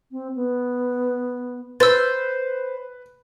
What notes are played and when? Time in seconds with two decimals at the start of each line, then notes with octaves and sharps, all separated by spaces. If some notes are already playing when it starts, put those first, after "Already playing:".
0.12 C4
0.35 B3
1.80 B4 C5 E6 A6